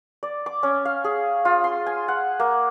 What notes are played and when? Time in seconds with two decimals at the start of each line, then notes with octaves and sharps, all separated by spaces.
0.23 D5
0.46 D6
0.63 C#4
0.85 F5
1.04 G#4
1.45 F4
1.64 C6
1.86 G#5
2.08 F#5
2.40 A#3